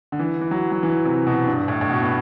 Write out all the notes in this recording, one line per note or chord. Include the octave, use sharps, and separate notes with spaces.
D3
E3
E3
F#3
F#3
E3
C3
B2
G2
A2
A2
B2
B3